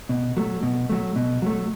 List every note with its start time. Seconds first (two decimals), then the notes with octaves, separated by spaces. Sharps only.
0.09 B2
0.37 F#3 A3
0.63 B2
0.89 F#3 A3
1.16 B2
1.42 F#3 A3